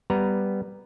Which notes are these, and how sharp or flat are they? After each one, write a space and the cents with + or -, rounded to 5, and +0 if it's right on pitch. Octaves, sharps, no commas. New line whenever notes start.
G3 +0 B3 +0 A#5 +0